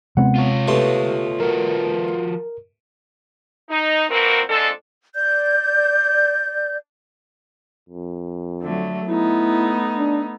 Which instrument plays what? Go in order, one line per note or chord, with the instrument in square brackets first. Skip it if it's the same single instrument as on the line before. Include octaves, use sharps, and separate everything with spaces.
[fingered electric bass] C3 G#3 C4 [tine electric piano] B3 F#5
[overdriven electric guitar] F4 C#5
[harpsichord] B2 A3 C6 [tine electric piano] G4
[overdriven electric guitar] F3 F#4 [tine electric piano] A#4
[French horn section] D#4
A#2 E3 A#3 C4 F#4 A#4
F2 F3 G#3 D4 A4
[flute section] D5 G6
[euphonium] F2
[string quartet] D3 F#3 A3
[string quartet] A3 B3 D#4 [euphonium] E4
[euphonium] D4